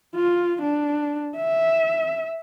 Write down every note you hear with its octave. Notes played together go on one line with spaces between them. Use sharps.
F4
D4
E5